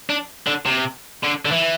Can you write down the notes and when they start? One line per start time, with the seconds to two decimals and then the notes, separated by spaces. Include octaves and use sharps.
0.10 D4
0.47 D3
0.66 C3
1.23 D3
1.45 D3
1.51 E3